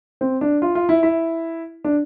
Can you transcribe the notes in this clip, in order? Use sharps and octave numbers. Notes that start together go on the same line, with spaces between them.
C4
D4
F4
F4
E4
E4
D4